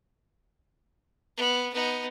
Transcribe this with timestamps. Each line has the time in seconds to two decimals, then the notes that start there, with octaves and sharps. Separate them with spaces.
1.37 B3
1.73 B3 D#4